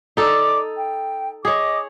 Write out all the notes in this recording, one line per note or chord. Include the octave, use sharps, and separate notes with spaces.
D#4 A4 D5 D6
G5
G#4 C#5 D#5 D6 D#6